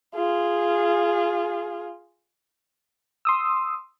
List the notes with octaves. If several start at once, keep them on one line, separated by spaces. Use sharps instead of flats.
F4 G#4
C6 D#6 E6